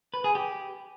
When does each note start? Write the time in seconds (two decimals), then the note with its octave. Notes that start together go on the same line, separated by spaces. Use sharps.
0.14 B4
0.24 G#4
0.35 G4